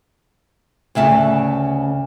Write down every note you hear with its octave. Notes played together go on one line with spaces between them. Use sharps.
D2 C#3 E5 A5